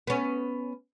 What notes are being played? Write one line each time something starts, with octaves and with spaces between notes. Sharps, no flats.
B3 C#4